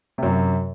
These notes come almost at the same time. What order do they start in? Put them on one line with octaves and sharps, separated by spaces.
C3 F#2 F#3